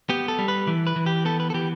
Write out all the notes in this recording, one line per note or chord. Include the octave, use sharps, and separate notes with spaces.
B3 G4
A4
G3
B4
E3
B4
E3
G4
B3 A4
B4
A4
E3 G4